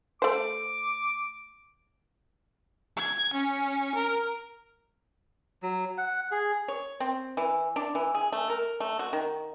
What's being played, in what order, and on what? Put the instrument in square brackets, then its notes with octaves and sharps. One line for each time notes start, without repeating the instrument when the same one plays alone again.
[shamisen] A3 C5 [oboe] D6
[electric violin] G#6
C#4
A#4
[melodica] F#3
F#5
G#4
[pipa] C#5
C4
E3
D4
E3
G#4
A3
A#4
A3
F#4
D#3